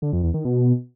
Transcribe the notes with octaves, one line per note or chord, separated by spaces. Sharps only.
D3
F2
E2
D#3
B2